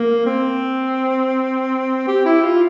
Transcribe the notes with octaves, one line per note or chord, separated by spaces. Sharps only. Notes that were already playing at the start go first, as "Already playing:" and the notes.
Already playing: A#3
C4
G4
E4
F4